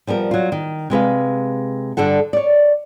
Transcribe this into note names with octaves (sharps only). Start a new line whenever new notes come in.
F3 G3 B3 A#4
F#3 F4
D#3
C3 G#3 B4 F5
G2 D3 G3 A4 F#5
C#5 D5